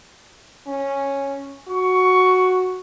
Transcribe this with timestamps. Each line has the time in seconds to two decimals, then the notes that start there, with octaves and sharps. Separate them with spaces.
0.67 C#4
1.68 F#4 C#6